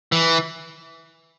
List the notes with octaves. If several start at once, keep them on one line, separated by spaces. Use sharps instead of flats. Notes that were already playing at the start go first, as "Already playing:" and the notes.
E3